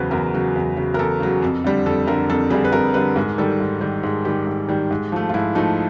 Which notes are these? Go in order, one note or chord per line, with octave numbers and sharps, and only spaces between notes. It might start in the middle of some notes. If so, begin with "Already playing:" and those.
Already playing: E2 C#3 F#3 B4 C5
E2 A#4
C#3 F#3
E2
C#3 F#3
A#4
E2 A4
C#3 F#3
F2
D3 G3
F2 A4
D3 G3 A#4
F2 A4
D3 G3 G#4
B4
F2 A#4
D3 G3 B4
G#2 A#4
D#3 G3 A4
G#2
D#3 G3
G#2 G#4
D#3 G3 G4
G#2
D#3 G3
G#2
F3 A3
F4
G#2 E4
F3 A3 D#4